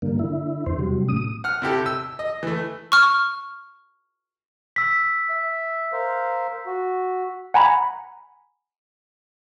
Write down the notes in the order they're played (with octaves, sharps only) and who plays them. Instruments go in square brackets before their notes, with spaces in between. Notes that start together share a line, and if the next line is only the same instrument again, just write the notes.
[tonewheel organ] G2 D3 A#3
D3 E4
[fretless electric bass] E2 [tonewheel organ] C5
[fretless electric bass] C3 [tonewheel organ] F#3 G3
[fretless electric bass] A2 A3 C#4 [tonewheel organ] D#6
[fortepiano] F#5 F6
C3 E4 G4 A4
E6
D#5
E3 A3
[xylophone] C#6 F6
[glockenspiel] E6 B6
[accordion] E5
A#4 C5 F5
F#4
[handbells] F#5 G#5 A#5 B5